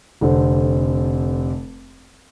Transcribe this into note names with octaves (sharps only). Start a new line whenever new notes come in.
F1 D3 C4